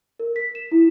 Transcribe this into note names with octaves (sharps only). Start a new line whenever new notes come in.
A#4
B6
E7
E4